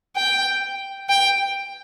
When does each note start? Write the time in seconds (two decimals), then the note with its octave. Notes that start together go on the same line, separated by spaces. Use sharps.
0.16 G5
1.09 G5